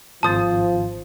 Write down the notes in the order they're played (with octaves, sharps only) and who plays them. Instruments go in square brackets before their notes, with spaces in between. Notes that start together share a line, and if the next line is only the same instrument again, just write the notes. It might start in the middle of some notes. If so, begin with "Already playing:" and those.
[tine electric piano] G#1 C5 [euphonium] F3 [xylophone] A5 D#6 A6